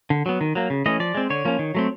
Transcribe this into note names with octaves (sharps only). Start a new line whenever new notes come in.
D3
F#3 B3
D#3
F#3 A#3
C#3
E3 A3 C#4 D#5
F3 D5
G#3 C4
D3 C#5
F3 A#3 C#4
D#3
F#3 A3 C4